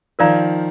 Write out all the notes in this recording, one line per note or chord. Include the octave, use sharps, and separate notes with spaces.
D#3 F3 A#4 D5 F5 A#5